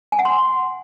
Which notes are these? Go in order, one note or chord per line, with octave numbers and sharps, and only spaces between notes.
G#5
F#5
C6